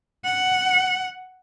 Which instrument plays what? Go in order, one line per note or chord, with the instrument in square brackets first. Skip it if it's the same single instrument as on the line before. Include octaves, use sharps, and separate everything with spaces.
[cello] F#5